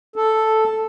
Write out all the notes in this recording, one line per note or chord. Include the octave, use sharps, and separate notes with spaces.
A4